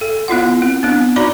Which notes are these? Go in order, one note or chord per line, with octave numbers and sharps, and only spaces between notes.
A4
B3 E4 F4 F#5
C4
B3 D4
D#4 F#4 D5 A#5 B5 D6